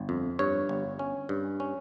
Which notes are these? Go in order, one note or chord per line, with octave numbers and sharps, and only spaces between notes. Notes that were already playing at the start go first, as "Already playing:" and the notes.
Already playing: G1
F2
G2 C#5
G1
C#4
G2
C#4